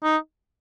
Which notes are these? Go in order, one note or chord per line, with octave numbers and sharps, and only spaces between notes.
D#4